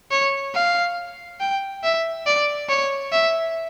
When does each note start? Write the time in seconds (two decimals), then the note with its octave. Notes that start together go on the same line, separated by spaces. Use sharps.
0.11 C#5
0.55 F5
1.40 G5
1.84 E5
2.26 D5
2.69 C#5
3.12 E5